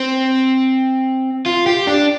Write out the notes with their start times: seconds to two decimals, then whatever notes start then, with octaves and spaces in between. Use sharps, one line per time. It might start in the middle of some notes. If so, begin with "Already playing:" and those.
Already playing: C4
1.46 F4
1.66 G4
1.87 D4